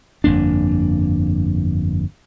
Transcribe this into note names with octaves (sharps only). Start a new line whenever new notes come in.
G1 F2 A#3 D4